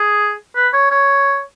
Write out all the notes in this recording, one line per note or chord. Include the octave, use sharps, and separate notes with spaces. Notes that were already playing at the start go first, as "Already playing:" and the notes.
Already playing: G#4
B4
C#5
C#5